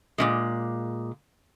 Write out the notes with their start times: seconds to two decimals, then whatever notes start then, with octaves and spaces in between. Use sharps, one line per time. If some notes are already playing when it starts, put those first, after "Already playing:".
0.18 A#2 C#3 G#3